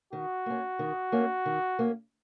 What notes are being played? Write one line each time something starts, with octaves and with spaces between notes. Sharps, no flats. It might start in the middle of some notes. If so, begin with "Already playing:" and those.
D#3 F#4
A#3 C#4
D#3
A#3 C#4
D#3
A#3 C#4